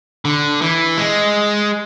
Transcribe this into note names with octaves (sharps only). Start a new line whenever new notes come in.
D3
E3
G#3